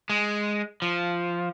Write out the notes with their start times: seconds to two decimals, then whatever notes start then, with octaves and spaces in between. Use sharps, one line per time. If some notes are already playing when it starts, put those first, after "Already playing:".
0.10 G#3
0.82 F3